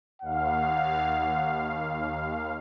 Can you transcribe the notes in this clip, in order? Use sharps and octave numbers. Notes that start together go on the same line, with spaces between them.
D#2 F5 F#5